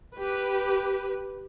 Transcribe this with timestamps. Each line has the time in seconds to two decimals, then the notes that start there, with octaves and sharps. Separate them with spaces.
0.17 G4 B4